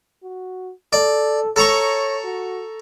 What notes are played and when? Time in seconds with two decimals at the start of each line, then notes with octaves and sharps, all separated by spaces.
0.23 F#4
0.93 A4 D5
1.56 A4 C#5 A#5 C#6
2.24 F#4